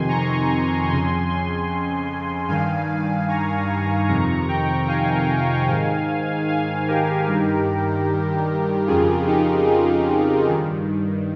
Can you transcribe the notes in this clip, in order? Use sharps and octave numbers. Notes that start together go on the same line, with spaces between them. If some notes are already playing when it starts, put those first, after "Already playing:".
Already playing: F2 C3 D#3 G#5 C6
A#5 C#6
F2 C#3 G#5 C6
G#5 C6
G2 D#3 F5 G#5
A#5 C#6
F2 C3 D#3 A#5 C#6
G5 A#5
F5 G#5
G#2 D#3
F5 G#5
G4 A#4
G2 D#3
F2 C#3 F4 G#4
D#4 G4
F4 G#4
G2 D#3